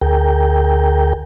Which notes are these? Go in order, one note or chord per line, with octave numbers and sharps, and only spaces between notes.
D2 G#4 A#4 G5